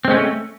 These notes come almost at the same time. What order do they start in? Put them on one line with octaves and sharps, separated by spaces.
C4 G#3 C#4 A3